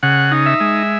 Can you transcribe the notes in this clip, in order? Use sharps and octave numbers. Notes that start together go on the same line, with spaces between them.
C#3 F#5
D#4
E5
G#3